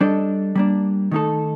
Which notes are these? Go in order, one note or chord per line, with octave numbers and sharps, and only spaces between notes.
G3 D4 A4 D#5
G3 A#3 D4
D#3 A3 D#4 A4